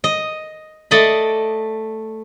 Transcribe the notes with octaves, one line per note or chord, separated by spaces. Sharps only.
D#5
A3 D5 D#5 B5